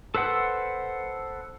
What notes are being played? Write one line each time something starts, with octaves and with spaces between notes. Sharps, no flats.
A4 B4 C5 F#5 E6